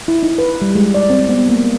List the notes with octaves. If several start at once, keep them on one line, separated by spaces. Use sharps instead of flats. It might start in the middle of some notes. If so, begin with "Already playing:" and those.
E4
D#4
B4
G3
G#3
D5
C4
B3
A#3